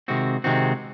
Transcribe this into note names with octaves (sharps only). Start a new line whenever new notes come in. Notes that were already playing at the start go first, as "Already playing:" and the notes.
C3 D#3 G#3 C4 F#4
C3 D#3 G#3 C4 F#4